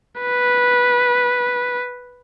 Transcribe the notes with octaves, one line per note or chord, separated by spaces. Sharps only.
B4